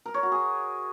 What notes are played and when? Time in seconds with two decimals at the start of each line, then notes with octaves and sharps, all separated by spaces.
0.06 A#4
0.14 C#5
0.23 F#4
0.32 G#4